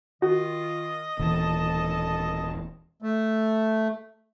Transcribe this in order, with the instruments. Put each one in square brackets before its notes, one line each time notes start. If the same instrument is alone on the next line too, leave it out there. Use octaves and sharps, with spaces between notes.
[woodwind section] D#3 F4 [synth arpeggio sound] F#4 [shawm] D#5
[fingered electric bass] D#1 E3 [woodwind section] A4 A5
[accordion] A3